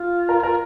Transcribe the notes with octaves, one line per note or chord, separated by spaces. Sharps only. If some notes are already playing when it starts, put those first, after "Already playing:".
Already playing: F4
A#4
A#4